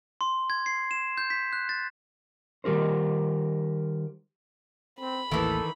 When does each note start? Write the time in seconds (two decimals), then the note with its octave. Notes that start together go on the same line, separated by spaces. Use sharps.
0.21 C6
0.50 G#6
0.66 C7
0.91 E7
1.18 G6
1.30 B6
1.53 F#6
1.69 A6
2.64 D#3 G3 G4 A#4 C5
5.00 C4 B5
5.31 A1 D#2 D#3 E3 A4